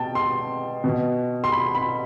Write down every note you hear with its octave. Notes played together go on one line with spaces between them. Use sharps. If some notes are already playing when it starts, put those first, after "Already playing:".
Already playing: B2 G5 A5
C6
B2
C6
B5
B5